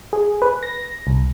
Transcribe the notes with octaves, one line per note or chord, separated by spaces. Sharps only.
G#4
B4
A#6
C2